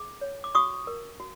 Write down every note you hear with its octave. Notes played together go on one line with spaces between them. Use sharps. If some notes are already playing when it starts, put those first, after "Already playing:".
Already playing: G#4 D6
C#5
D6
F#4 C#6 D#6
A#4
F#4